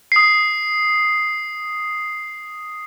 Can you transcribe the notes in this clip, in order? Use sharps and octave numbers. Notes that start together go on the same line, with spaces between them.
D#6 C7